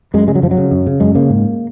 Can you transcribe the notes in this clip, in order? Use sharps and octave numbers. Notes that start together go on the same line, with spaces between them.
F#2 G#3
C#3 G#3
F#3
F#2 F3
F#3
C#3
F#2
C#3
F#2 G#3
C#3 A#3
G#2